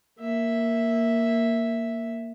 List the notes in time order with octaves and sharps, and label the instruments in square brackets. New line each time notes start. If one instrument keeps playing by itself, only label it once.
[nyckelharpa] A#3 E5